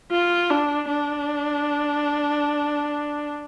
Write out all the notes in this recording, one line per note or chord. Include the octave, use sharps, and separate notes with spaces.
F4
D4
D4